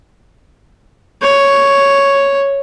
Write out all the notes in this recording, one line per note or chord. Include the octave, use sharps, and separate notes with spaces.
C#5